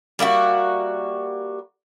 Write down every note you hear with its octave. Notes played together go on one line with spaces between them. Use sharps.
G3 A#3 E4 F#4